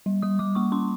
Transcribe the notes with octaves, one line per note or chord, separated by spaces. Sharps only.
G3
G3 D#6
G3 D6
A#3 C#6
C#4 C6